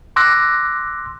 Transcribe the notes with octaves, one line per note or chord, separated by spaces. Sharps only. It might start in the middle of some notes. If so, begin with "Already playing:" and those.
C6 D6 E6 F#6 A#6